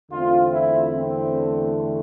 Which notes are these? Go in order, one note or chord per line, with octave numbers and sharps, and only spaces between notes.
E2 D3 A3 C4 F4
E4
C4